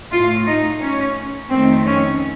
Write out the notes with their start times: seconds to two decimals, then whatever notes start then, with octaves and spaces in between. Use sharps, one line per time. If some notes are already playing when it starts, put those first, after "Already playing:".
0.12 A2 A3 F4
0.46 D#4
0.81 C#4
1.49 F2 D#3 A3 C4
1.84 C#4